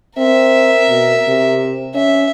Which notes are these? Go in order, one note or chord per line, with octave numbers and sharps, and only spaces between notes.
C4 A#4 E5
B2
C3
C#4 E5